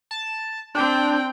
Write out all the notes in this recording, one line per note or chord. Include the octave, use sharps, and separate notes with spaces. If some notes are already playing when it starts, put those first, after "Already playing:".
A5
C4 D4 G5